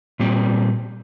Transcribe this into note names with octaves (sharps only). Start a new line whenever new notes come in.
A#2 G3 C4